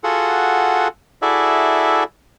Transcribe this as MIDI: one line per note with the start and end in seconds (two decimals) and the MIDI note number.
0.04 0.88 65
0.04 0.88 66
0.04 0.88 68
0.04 0.88 69
0.04 0.88 78
1.22 2.03 64
1.22 2.03 66
1.22 2.03 68
1.22 2.03 69
1.22 2.03 74
1.22 2.03 76